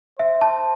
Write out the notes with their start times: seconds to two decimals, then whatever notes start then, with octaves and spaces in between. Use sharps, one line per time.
0.19 C5 E5
0.41 A5